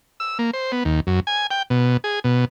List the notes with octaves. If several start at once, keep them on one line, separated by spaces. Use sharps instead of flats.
E6
A#3
C5
B3
D#2
F#2
G#5
G5
B2
G#4
B2